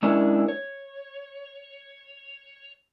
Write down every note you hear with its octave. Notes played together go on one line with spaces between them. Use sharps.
G#3 C#4 D4 E4 A#4
C#5